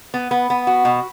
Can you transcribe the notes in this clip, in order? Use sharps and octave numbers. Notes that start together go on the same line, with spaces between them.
B3
B3
B3
F#4
B2